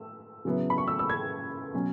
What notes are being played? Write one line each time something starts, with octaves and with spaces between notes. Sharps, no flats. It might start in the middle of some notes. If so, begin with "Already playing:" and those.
Already playing: E6
C#3 F#3 B3 E4
B5
C#6
E6
E6
G#6
B2 F#3 C#4